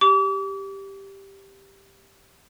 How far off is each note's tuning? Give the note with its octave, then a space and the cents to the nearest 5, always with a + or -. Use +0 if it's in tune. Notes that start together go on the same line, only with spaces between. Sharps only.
G4 +0 D6 -40